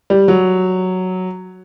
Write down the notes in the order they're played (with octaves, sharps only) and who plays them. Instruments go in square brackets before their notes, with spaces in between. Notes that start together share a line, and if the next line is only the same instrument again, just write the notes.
[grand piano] G3
F#3